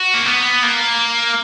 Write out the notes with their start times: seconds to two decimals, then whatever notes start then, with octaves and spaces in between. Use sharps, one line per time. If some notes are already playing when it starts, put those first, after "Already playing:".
Already playing: F#4
0.14 A#3
0.26 B3
0.63 A#3